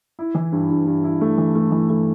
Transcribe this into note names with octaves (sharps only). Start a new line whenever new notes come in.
E4
E3
G2
G2
G2
E4
A3
E3
A3
E3
A3